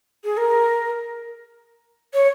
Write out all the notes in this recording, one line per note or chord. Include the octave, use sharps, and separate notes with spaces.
G#4
A#4
C#5